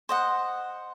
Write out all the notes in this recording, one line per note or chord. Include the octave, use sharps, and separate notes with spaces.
C5 D#5 F#5